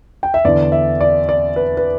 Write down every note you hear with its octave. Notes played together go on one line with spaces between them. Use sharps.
G5
E5
E2 D3 D5
E5
D5
D5
B4
B4